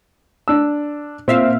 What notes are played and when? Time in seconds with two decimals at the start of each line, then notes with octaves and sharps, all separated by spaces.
0.48 D4 E6
1.28 A#2 C4 E5 F5